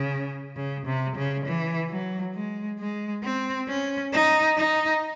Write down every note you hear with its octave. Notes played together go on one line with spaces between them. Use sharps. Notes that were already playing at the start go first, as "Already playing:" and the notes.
Already playing: C#3
C#3
C3
C#3
E3
F#3
G#3
G#3
C4
C#4
D#4
D#4